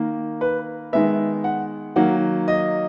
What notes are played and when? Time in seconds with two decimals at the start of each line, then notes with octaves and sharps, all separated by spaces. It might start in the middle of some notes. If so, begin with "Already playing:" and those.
Already playing: D#3 A#3
0.41 B4
0.93 D#3 G#3 B3 E5
1.44 F#5
1.96 D#3 F#3 A#3 F#5
2.48 D#5